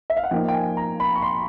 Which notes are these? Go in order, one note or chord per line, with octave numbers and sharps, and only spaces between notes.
E5
F5
F#5
F3 A#3 D#4 G5
G5
G#5
A#5
B5
C#6
C6